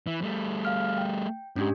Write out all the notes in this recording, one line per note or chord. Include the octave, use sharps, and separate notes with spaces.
E3
G3 A3
F5 F6
G5
G#2 C#4 D4 G4